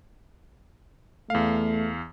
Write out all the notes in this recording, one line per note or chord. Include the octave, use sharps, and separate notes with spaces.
E2 A3 F5